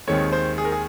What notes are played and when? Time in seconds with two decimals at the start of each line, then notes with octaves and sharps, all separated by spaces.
0.08 D#2 D#3 G#3 C4 C#5
0.33 C5
0.58 G#4
0.65 A#4
0.72 G#4